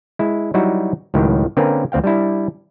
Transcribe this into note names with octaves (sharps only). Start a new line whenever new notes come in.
G#3 E4
F#3 G3 D#4 E4 F#4
C#2 A2 D#3 F#3 G4
D3 A#3 C4 C#4 A#4 B4
D2 C4 F5 G5
G3 D4 E4